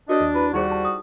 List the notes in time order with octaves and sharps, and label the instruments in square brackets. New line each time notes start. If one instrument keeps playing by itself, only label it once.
[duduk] D4 [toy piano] F#4 A#4 C#5 [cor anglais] D#5
[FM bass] D#2
[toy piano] E4 [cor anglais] B4
[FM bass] D#2 [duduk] G3 [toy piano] D#4 G#4 C5 [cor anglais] F#4
[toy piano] A5
D#6